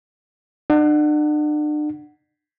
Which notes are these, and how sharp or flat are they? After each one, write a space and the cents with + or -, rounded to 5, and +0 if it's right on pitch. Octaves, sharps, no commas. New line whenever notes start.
D4 +40 F#5 +0